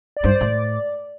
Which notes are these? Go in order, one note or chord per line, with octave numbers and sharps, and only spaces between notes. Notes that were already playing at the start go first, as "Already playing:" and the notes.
D5
G2 C5
D5
A2